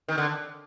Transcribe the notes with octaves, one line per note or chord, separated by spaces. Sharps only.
D#3
D3